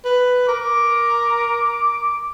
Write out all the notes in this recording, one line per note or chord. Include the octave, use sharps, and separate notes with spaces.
B4
A#4 D6